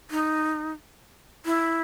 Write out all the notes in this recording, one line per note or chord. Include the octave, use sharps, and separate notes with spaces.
D#4
E4